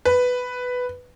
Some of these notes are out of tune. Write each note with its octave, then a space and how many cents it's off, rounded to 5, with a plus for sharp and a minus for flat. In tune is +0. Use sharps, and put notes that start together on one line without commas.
B4 +5